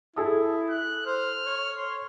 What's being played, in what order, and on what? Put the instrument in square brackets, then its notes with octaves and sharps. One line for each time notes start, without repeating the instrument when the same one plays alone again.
[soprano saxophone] E4 [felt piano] G#4 A4 D#6
[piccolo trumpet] F#6
[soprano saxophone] C5 [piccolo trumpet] F6
[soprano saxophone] C#5
[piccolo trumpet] C6